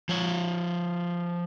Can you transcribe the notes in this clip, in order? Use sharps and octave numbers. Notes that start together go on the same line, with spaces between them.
F3 C#5